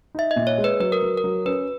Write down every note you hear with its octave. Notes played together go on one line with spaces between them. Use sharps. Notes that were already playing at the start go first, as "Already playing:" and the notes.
D#4 E5
D#5
A#2
C#5
G#3
B4
F#3 B4
A#4
F#3
A#4
F#3
C#4 B4